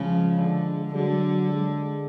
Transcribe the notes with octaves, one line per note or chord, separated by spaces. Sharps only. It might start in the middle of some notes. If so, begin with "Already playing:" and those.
Already playing: C#3 F3 G#3
D3
D3 F#3
G#3